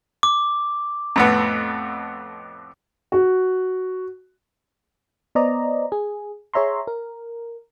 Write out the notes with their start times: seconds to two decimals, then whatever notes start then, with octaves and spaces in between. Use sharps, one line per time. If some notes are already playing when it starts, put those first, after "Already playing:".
0.23 D6
1.16 F2 A2 B3
3.12 F#4
5.35 B3 C5 D5 D#5 A#5
5.92 G#4
6.54 G#4 C#5 E5 A#5 C6
6.87 A#4